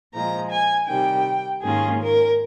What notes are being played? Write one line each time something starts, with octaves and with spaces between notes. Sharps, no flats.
A#2 F3 G#3 A#5
G#5
C3 D#3 G3 G5
G#2 D#3 A#3 C#4 F4 G#4
A#4